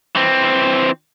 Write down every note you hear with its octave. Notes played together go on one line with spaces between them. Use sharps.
E3 C4